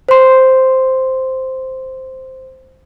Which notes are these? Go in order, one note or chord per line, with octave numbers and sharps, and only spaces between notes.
C5 C6